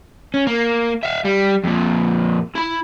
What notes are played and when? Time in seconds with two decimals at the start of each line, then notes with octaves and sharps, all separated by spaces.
0.34 C#4
0.47 A#3
1.03 E5 F5
1.25 G3
1.64 F2 A#2
2.55 E4 B5